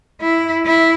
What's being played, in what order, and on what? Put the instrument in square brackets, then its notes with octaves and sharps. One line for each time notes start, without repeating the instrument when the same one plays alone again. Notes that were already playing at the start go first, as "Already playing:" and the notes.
[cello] E4
E4